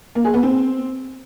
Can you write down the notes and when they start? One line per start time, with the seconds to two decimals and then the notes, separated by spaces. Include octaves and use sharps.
0.15 A#3
0.25 G#4
0.34 B3
0.43 C4